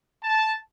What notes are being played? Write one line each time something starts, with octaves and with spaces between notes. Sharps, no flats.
A5